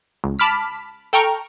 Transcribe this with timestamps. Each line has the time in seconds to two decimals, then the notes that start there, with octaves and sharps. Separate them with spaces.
0.24 C#2
0.39 A5 B5 D6 F6 B6
1.13 A4 G5 A#5 C#6 F6